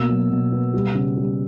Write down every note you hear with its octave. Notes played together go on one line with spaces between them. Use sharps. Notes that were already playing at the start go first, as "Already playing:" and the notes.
Already playing: B2 A#3 E6
F#3
B2
B3
G3
C#3
G3